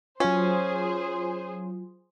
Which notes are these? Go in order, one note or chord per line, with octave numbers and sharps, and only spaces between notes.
F#3 C#4 F4 G#4 C5